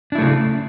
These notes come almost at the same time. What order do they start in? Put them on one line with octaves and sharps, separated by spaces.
D4 E4 A3 C#3